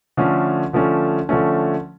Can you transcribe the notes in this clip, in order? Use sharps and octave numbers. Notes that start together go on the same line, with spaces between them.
D3 F3 A3 C#4
D3 F3 A3 C#4
D3 F3 A3 C#4